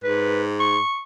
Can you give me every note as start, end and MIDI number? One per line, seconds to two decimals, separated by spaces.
0.04 0.79 44
0.04 0.43 71
0.60 1.03 85